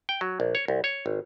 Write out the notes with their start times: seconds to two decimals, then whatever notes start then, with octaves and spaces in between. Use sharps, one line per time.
0.09 G5
0.21 F#3
0.40 A#1
0.55 C#5
0.68 C2
0.84 C#5
1.06 G#1